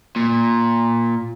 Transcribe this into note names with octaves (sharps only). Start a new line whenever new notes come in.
A#2